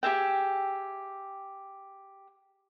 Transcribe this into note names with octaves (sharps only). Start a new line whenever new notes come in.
G4 G#4 E5 G5